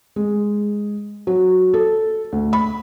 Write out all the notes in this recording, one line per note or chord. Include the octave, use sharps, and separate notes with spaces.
G#3
F#3
A4
D2
B5